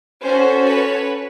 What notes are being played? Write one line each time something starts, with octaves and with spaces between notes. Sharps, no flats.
C#4 F#4 A4 C5
B4 C#5